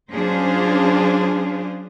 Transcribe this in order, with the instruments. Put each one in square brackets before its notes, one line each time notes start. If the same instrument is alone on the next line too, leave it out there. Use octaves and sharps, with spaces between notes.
[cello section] F#3 C#4 D4 F4 G#4 C5